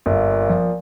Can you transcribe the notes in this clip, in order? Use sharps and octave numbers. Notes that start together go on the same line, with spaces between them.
G1 A#2
F3